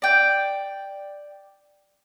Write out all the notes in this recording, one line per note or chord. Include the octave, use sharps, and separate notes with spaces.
D5 G5